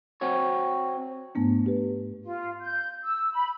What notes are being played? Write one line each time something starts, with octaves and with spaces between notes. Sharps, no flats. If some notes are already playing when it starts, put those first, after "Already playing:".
C4 F#4 C#5
G#2 A3 B3 D4
G4 B4
F4
G6
E6
B5